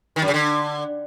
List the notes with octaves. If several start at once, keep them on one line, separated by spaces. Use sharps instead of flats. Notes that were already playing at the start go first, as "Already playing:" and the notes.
D#3
F#2
C#3
D3